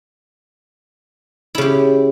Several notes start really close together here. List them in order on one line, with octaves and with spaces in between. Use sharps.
E4 C#3 G4